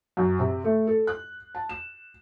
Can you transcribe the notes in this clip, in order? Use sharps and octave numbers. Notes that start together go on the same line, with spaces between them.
F#2
C3
A3
A4
F#6
A5
E7